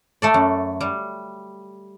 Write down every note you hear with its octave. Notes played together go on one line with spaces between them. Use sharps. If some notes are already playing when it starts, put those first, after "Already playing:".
A3 A4 D5
F#2
G3